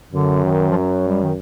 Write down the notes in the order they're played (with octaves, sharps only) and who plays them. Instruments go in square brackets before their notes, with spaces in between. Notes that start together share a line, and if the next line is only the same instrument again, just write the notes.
[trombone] F#2 [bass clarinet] D3
[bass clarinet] D#3
F3
F#3
G3
D#3